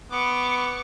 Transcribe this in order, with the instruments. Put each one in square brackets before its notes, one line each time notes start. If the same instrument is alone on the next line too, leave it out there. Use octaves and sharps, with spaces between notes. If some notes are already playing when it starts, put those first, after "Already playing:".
[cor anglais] B3 [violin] C#6 D6